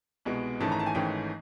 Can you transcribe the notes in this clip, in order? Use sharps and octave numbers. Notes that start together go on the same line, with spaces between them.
C2 B2 G#3 B3
G#1 G#2 E3 A3 C#4 A5
A#5
A5
G#5
G#1 G#2 E3 A3 C#4 G5